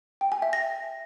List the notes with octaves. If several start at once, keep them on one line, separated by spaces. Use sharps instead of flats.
G5
G#5
E5
A#6